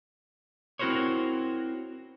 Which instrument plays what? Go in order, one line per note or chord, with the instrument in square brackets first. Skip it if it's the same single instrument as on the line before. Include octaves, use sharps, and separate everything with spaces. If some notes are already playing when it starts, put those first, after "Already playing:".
[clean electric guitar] C4 E4 F#4 A#4 C5 C#5